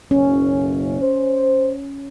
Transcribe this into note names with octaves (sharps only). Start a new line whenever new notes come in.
F#1 B1 C#4
C5